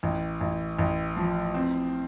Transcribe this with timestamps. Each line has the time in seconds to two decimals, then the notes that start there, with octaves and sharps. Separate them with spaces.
0.03 A1
0.41 A1
0.78 A1
1.17 F3
1.55 C4